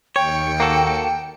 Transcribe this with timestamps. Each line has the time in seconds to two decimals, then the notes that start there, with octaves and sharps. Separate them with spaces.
0.16 D#2 C#5 G5 C#7
0.60 A#3 F#4 A4